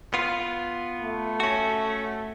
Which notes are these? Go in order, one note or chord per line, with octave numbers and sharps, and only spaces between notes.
B3 F4
A3
C#4 F#4